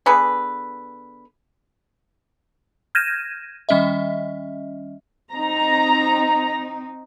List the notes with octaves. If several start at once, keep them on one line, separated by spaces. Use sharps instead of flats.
D3 B3 G#4 B4
F6 G6 G#6 A#6 D#7 E7
D#3 G3 C#4 D#5 E5
C4 D#4 A#5